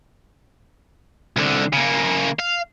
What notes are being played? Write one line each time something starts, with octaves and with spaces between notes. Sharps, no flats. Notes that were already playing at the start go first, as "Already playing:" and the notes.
C2 D3
C#3 A#3
F5